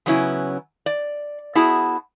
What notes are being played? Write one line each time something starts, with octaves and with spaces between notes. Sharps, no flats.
C#3 F#3 B3 C#4 E4
D5
B3 E4 F#4 G#4 A5